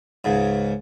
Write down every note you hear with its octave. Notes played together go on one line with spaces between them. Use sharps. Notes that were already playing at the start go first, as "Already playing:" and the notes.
C#2 G#2